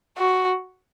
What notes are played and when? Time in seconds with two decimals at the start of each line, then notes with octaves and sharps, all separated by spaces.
0.17 F#4